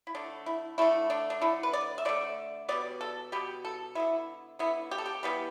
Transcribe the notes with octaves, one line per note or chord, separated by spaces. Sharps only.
E4
D3 A3 D4
E4
D3 A3 E4
D4
D4
D3 A3 E4
B4
D5
E5
D3 A3 D5
B2 G3 B3 D5
A4
B2 G3 B3 G4
A4
D3 B3 E4
D3 B3 E4
G4
A4
G4
E3 G3 B3